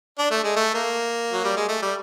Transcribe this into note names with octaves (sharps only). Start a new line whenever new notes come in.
D4
A3
G#3
A3
A#3
F#3
G3
G#3
A3
G3